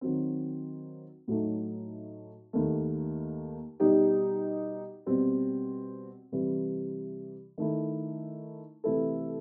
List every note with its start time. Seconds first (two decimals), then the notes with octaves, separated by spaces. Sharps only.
0.01 D#3 F#3 C4
1.28 A2 F#3 A3 D#4
2.53 D#2 D#3 A3
3.80 B2 G3 D#4 G4
5.06 B2 G3 C4
6.32 C3 E3 G3
7.58 D#3 A3 E4
8.84 C3 E3 A3 E4 A4